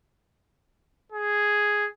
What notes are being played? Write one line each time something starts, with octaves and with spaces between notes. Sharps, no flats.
G#4